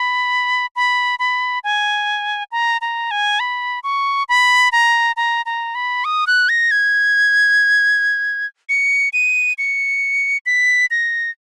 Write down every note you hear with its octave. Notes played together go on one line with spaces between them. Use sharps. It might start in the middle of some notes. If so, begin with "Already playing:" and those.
Already playing: B5
B5
B5
G#5
A#5
A#5
G#5
B5
C#6
B5
A#5
A#5
A#5
B5
D#6
F#6
A#6
G#6
C#7
D#7
C#7
B6
A#6